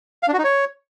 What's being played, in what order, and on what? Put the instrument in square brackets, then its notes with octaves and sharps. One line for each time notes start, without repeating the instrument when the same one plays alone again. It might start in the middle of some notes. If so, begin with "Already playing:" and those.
[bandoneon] F5
D4
F#4
D#4
C#5